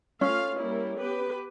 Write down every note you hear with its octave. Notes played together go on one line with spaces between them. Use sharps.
A3 C#4 F4 F5
G3 A#3 E4
B3 G4 B4